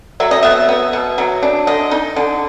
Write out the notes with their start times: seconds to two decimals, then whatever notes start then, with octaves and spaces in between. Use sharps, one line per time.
0.20 F#3 E5
0.31 D#5
0.43 B3 E5
0.69 B3
0.93 B2
1.18 F#3
1.42 D4
1.67 D3 D#5
1.91 D#4
2.16 D3